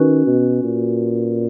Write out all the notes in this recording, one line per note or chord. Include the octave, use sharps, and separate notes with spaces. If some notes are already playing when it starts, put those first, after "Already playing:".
Already playing: D#3 C#4 F#4 B4
B2
A#2